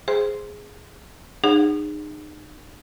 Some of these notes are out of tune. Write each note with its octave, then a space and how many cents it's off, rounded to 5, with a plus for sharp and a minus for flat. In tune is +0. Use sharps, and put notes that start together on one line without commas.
G#4 +0 C5 +0 C6 +0
D#4 -40 G#4 -20 F#5 +0